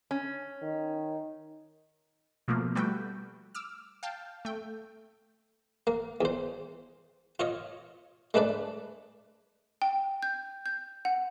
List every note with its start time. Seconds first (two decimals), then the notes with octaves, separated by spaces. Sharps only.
0.11 C#4
0.62 D#3
2.48 B2 F3 A3 A#3
2.75 G3 A3 F#4 B4 G5
3.55 D6 E6 F6
4.03 F5 G5 A5
4.45 A3 G5
5.87 A#3
6.21 E2 C5
7.40 F4 C#5 D#5
8.34 G#3 A3 D4 B4 D5
9.82 G5
10.23 G6
10.66 G6
11.05 F#5